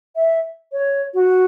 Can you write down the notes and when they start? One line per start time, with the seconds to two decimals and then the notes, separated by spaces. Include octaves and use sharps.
0.16 E5
0.72 C#5
1.14 F#4